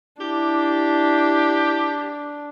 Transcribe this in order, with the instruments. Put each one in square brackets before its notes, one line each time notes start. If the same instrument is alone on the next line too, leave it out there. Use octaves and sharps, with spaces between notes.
[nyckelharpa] D4 [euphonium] E4 [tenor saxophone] G4